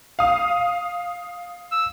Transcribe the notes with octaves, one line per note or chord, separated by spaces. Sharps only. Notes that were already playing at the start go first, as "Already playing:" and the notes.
F5 D#6
E6